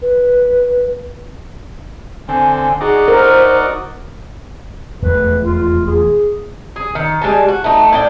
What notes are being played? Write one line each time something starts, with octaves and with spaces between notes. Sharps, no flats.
B4
D3 C4 G#5
D#4 F#4 G#4 D5
A#4 C5
E1 F2 A3 B4
F4
G#4
G#4
D#3
G3 G#3 G#5 A5
F#4
A3 D#4
A2 D5 G5